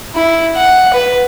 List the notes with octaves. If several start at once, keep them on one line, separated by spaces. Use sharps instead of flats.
E4
F#5
B4